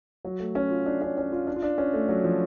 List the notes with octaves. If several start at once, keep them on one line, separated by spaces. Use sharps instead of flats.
F#3
A3
C#4
F4
D4
C#4
C#4
F4
D4
F4
D4
C#4
A3
F#3
F3